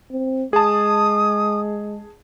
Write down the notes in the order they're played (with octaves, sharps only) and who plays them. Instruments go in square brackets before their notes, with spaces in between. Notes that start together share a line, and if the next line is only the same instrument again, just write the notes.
[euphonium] C4
[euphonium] G#3 [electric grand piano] G#4 A5 [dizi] D#6